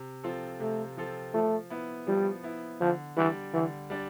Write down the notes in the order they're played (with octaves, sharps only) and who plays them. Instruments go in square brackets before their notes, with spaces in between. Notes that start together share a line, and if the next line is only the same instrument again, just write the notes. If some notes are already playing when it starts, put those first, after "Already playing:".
Already playing: [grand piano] C3
F3 C4 F4 A4
[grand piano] C3 [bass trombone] A3
[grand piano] F3 C4 F4 A4
[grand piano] F3 [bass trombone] A3
[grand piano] B3 E4
[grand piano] F3 [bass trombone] G3
[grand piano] B3 E4
[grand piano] D3 [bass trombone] F3
[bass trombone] E3 [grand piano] G3 D4
[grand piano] D3 [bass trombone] E3
[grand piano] G3 D4